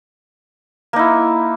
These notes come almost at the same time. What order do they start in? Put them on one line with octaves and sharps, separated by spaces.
A#3 D#4 E4